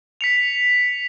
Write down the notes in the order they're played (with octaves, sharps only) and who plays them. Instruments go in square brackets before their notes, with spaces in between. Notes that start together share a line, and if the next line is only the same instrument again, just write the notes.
[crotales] B6 C#7 F7